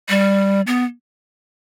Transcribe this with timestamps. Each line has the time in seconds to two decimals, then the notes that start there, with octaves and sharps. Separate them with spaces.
0.09 G3
0.67 B3